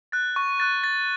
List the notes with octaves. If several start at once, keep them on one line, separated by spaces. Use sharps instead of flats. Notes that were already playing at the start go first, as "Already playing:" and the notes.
F#6 A6
C#6
F#6 A6
A6